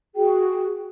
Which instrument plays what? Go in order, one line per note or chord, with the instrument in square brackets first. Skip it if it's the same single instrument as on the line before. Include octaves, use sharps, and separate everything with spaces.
[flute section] F#4 G#4 G5